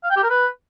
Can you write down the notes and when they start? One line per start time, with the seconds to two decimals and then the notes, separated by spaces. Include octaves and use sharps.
0.04 F5
0.10 G5
0.17 G4
0.23 A#4
0.30 B4